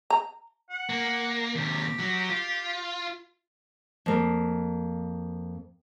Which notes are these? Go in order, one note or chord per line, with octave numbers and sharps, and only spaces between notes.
A#5
F#5
A#3
D#2 C3 G4
F#3
F4
F2 A#3